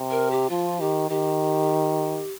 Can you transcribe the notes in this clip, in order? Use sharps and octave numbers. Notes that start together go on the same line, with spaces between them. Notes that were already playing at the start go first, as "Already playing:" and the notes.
Already playing: C3
A#4
G4
F3 F4
D#3 G4
D#3 G4